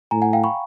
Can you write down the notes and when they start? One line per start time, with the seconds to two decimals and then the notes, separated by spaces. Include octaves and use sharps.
0.11 A2 G#5 A#5
0.22 F#5 G#5
0.33 F5 G5
0.44 B5 C#6